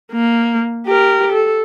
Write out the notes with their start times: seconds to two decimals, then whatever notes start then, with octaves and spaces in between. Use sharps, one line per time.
0.12 A#3
0.86 G4 A#4
1.32 A4